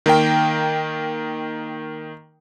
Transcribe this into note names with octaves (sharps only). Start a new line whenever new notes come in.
D#3 A#3 A#4 G5